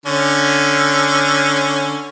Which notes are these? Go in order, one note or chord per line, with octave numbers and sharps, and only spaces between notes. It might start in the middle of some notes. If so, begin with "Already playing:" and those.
D3 C#4